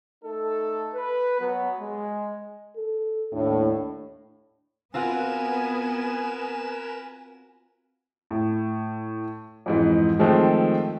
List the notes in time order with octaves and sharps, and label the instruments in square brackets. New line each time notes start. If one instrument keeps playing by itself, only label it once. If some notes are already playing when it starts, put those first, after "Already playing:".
[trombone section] A3 D#4 A4
B4
F#3 B3
G#3
[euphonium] A4
[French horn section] D#2 A2 [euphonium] D4
[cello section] B3 [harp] C4 F4 F#4 [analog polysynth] A#4 B4 E7 [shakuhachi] G#5
[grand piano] A2
F2 G#2 E3
D#3 F3 G#3 A3 C4